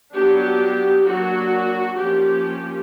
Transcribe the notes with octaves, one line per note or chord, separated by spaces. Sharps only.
F#3 B3 D4 G4
F#3 A#3 D4 F#4
F3 A#3 C#4 G4